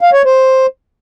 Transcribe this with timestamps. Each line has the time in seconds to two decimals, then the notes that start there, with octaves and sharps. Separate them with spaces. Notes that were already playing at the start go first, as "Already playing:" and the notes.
0.01 F5
0.13 C#5
0.25 C5